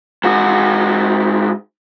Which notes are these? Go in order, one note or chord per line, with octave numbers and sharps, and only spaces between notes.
G#2 F#4